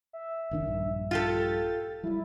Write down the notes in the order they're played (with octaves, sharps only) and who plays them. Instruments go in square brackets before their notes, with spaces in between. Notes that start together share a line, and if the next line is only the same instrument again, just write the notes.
[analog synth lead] E5
[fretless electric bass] F#1 D#3 D4
A#1 G2
[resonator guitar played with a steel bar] F4 G4 A4 [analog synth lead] A6
[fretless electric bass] F#3 G3 [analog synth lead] E4